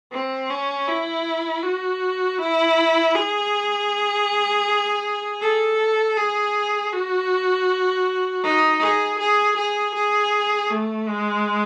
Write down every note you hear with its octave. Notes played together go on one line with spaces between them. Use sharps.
C4
C#4
E4
F#4
E4
G#4
A4
G#4
F#4
D#4
G#4
G#4
G#4
G#4
A3
G#3